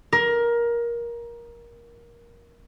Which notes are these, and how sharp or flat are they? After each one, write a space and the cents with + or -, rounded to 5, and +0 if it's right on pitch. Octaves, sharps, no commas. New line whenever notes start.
A#4 +15